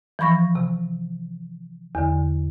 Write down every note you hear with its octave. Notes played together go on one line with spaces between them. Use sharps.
E3 F3 B5 C#6 A#6
C3
E2 D3